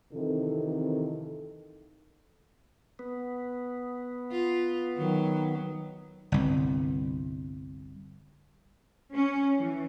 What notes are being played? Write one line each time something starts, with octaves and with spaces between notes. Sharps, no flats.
F2 C3 D#3 E3 A4
B3
F4
D#3 F#3
G1 C2
C#4
E3